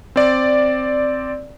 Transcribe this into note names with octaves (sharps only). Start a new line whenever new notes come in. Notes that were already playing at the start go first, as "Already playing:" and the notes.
C4 D5